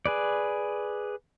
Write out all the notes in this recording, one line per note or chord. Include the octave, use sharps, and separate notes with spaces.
G#4 B4 D5